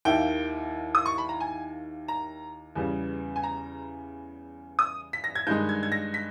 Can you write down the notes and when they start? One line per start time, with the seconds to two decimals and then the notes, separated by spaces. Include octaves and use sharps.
0.05 D#2 D#3 A#3 E4 G5
0.95 D#6
1.06 C#6
1.18 B5
1.29 A#5
1.40 G#5
2.08 A#5
2.76 E2 C#3 G3 B3
3.36 G#5
3.43 A#5
4.79 D#6
5.13 B6
5.24 A#6
5.35 G#6
5.47 G2 D#3 G#3 D#4 G6
5.69 G#6
5.83 G#6
5.92 A#6
6.14 B6